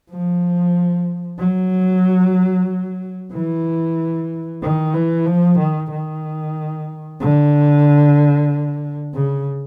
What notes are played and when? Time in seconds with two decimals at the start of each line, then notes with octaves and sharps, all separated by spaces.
0.10 F3
1.39 F#3
3.33 E3
4.62 D#3
4.94 E3
5.27 F3
5.59 D#3
5.91 D#3
7.20 D3
9.14 C#3